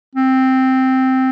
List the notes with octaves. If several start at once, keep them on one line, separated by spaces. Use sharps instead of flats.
C4